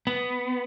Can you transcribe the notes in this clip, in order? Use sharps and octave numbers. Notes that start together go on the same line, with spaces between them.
B3